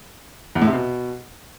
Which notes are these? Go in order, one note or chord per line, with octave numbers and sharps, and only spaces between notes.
E2
A2
C3
B2